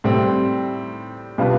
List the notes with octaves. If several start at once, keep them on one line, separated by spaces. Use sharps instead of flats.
A2 G3 C4
B2 G3 D4 F4 B4